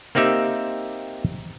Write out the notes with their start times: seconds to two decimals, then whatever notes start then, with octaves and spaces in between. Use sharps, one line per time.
0.15 A#3 C4 D#4 G4 E5